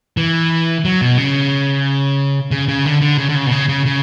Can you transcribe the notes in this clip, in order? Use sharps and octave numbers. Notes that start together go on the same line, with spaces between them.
E3
F#3
B2
C#3
C#3
C#3
D3
D3
C#3
D3
C#3
B2
C#3
C#3
C#3